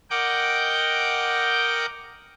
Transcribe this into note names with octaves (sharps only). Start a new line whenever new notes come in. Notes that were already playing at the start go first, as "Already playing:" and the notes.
A#4 D#5 F#5 G5 D6 G6